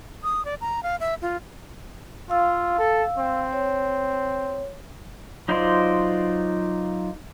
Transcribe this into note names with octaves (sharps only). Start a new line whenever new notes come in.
D#6
D5
A#5
F5
E5
F4
F4 F5 E6
A4
C4
C#5
F#3 D#4 F4 C5 D5